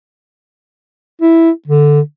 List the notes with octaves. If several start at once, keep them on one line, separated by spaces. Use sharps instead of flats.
E4
D3